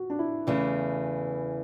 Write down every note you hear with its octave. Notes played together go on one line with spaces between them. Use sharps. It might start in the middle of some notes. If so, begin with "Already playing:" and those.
Already playing: F#4
D4
E4
E2 C#3 E3 A3 E4